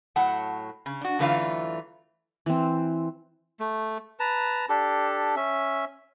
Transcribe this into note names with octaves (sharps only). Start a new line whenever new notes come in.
A2 F#3 F#5 A5
C#3
D4 F#4
F#2 D3 E3 A3 F4 F5
E3 C4
A3
B4 A5 A#5
D4 G4 A4
C#4 E5